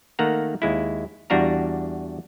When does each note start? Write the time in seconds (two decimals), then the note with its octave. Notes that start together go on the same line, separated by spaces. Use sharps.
0.19 D#3 A3 A#3 F#5 A#5
0.62 D#2 G#3 E4
1.30 E2 G3 D4 F#4 F5 A#5